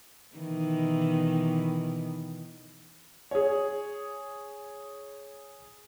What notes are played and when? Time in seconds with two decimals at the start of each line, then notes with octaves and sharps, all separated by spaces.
0.36 B2 D#3 E3
3.31 G#4 C#5